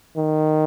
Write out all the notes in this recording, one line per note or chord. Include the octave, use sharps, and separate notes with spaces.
D#3